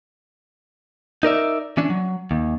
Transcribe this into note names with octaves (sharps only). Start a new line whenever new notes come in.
D#4 A#4 D5 E5
E3 C#4 D4
F#3
D#2